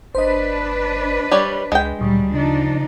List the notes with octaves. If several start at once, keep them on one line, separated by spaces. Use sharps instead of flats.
G1 D4 B4 C5 D#5
G3 C#5 D5
C#2 G#3 G5
D2 A#2 F#3 G3
C#3 F3 D4 D#4